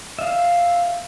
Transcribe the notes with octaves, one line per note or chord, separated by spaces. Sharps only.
E5 F5